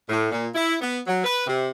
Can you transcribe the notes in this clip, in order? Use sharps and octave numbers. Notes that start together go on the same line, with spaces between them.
A2
A#2
E4
B3
F#3
B4
C3